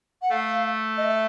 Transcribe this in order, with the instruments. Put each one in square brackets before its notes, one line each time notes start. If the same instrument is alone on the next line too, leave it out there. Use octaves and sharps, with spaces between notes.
[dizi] F#5
[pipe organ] A3 [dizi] F5
[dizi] D#5
E5